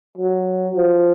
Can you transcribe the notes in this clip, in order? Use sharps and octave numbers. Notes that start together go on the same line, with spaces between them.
F#3
F3